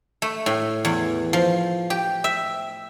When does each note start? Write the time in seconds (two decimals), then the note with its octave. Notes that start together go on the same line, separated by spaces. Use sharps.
0.22 A3
0.46 A2
0.85 E2
1.33 F3
1.90 G4
2.24 E5